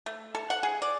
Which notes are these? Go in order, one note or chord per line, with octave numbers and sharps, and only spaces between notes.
A3
A4
F#5
G#4
D5